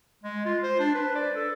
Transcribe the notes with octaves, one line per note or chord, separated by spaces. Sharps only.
G#3
F4
C5
D4
B4
D5
A4